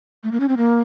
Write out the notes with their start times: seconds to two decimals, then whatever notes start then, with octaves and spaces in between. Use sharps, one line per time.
0.24 A3
0.32 A#3
0.40 C#4
0.49 C4
0.57 A#3